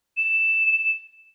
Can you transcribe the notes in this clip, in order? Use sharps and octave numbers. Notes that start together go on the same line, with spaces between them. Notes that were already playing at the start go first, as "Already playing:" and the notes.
E7